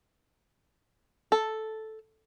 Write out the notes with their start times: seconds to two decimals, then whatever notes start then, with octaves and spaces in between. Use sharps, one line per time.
1.32 A4